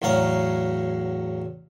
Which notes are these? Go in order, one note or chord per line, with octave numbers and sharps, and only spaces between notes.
E2 A2 F#3 F5 A#5